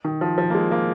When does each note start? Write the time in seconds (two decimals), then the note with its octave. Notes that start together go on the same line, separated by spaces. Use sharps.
0.05 D#3
0.21 F3
0.38 F3
0.50 A#3
0.54 G#3
0.71 A#3